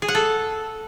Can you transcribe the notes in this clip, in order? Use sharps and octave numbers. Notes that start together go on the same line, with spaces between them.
G#4
F#5
A4